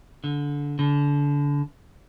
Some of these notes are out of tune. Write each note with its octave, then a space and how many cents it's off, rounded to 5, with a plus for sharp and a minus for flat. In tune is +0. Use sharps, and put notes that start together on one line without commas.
D3 -20
D3 -30